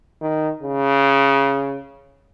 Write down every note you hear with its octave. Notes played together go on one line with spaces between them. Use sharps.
D#3
C#3